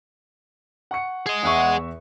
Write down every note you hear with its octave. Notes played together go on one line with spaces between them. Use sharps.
F#5 C#6 C#7
G#4 D#5
E2 E5 F#5 C#6